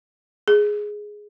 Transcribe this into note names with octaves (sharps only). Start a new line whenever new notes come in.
G#4